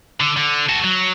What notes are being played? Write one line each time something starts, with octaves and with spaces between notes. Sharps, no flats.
D3
D3
F#4 A4
F#3